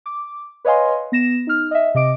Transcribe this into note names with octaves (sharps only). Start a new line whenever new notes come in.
D6
B4 C#5 D#5 F5 G#5 C6
B3 A#6 E7
D#4 F6
D#5 E5
C3 D#5 D6 D7